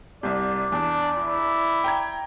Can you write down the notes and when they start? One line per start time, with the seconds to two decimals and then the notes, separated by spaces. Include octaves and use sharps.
0.23 C2 C3 D5
0.72 E2 D4
1.18 E4
1.84 G5 A#5 G#6